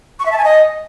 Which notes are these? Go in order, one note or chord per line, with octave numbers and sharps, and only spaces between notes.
C#6
E5
A5
G#5
D#5